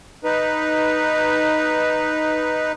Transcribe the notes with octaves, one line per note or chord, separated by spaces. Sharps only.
D#4 B4